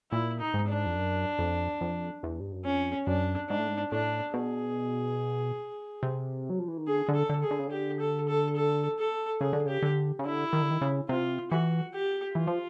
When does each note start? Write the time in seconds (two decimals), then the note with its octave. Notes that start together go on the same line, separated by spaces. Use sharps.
0.11 A#2 E4
0.40 D#4
0.54 G#2
0.68 D4
0.86 F2
0.96 F#2
1.39 F2
1.81 F2
2.23 E2
2.40 G2
2.52 F#2
2.65 F2 C#4
3.07 F#2 D4
3.49 G#2 D4
3.59 A2
3.68 G#2
3.92 A2 D4
4.34 B2 G#4
6.03 C3
6.50 F#3
6.59 F3
6.68 E3
6.78 D#3
6.87 D3 G#4
7.08 D3
7.15 A4
7.29 D3
7.44 G#4
7.51 D3
7.59 C#3
7.67 D3 G4
8.00 A4
8.28 A4
8.56 A4
8.99 A4
9.41 C#3 G#4
9.53 D3
9.66 C#3 G4
9.82 D3
10.19 C#3
10.25 D3 E4
10.53 D#3
10.62 D3
10.71 D#3
10.81 C#3
11.09 C3 F4
11.51 E3 F#4
11.94 G4
12.35 E3 F4
12.47 F3